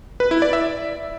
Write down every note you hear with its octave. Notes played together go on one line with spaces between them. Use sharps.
B4
E4
D5
E5